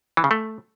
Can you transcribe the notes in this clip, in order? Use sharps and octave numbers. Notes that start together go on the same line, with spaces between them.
E3
C#3
A3